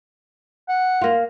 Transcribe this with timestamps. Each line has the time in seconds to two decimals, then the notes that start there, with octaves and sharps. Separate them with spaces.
0.68 F#5
1.02 A#3 F4